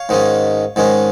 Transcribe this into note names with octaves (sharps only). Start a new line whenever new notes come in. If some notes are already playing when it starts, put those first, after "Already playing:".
Already playing: C#5 F5
G#2 D#3 G#3 C#4
G#2 D#3 G#3 C#4